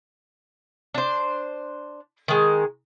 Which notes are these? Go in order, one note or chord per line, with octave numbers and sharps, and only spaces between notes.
D4 C5
D#3 G#3